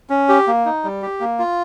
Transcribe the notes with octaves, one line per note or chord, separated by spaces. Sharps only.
C#4
G4
A#3
D#4
G3
G4
A#3
F4